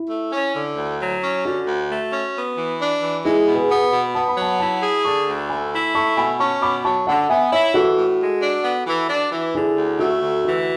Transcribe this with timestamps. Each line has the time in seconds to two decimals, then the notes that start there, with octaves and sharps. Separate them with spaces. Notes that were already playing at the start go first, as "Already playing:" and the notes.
Already playing: E4
0.10 A3
0.33 C#4
0.55 D3
0.77 D2
1.00 F#3
1.23 C#4
1.45 D3 F#4
1.67 D2
1.90 A3
2.13 C#4
2.35 B3
2.58 E3
2.80 D4
3.03 E3
3.25 G#3 E4 G#4
3.48 B2
3.55 G#4 B4
3.70 B3
3.92 B2
4.15 B3 A5
4.28 B5
4.37 F#3 F#5 A5
4.59 E4 F#5 A5
4.82 G#4
5.05 D3 A5 C#6
5.27 D2
5.49 A3 G#5 B5
5.73 E4
5.95 A3 A5 C#6
6.17 B2 G#5 B5
6.40 C#4 A5 C#6
6.62 B2 B5 D6
6.85 F#3 A5 C#6
7.07 D3 F#5 A5
7.29 B3 E5 G#5
7.52 E4 C#5 E5
7.74 E3 F#4 A4
7.97 A2
8.20 G#3
8.42 D4
8.64 B3
8.87 E3
9.09 D4
9.32 E3
9.55 D3 E4 G#4
9.77 D2
9.99 A3 F#4 A4
10.22 D2
10.45 E3 F#4